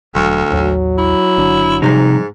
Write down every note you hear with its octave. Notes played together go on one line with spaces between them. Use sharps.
E1 D2 F#3
A1 D#2 F#3
E4
F#1 D3 D4
G#2 C3 F3 G3 C4 D#4